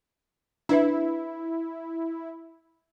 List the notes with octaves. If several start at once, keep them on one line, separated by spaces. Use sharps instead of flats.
D4 E4 B4 E5